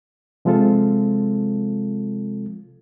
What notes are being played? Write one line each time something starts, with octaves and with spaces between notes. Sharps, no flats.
C3 F3 G#3 C4 F4 A4